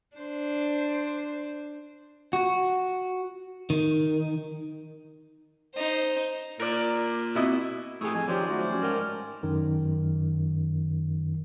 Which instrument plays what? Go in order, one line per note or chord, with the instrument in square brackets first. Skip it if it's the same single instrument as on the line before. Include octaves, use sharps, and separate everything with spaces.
[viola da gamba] D4 C5
[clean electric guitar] F#4
D#3
[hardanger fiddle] D#4 C5
[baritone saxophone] A#2 [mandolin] A#4 D5
[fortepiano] B2 E4 D#5 [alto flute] C4
[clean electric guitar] A2 G4 [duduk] G#4 [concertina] C#6 D#6 E6
[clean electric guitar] F2 [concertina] D#5 [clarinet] G#5
[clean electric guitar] F#2 D#3 F3 [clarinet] F#3 [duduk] G4 [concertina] C5 D5
[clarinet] A3 [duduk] F#4
[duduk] C#4
[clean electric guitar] G#2 G5 [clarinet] A#4
[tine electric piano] F#2 D#3